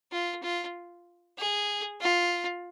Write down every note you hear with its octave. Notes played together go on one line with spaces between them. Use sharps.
F4
F4
G#4
F4